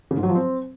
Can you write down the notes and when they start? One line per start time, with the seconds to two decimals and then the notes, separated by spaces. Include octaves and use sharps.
0.11 C#3
0.17 G#2
0.23 F#3
0.29 F3
0.35 C4